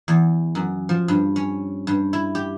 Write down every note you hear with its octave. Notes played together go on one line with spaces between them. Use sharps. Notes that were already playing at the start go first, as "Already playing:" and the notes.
E2
F#2
F3
G2
C#4
G2
E4
G4